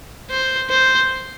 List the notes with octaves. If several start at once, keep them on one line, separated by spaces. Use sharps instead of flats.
C5
C5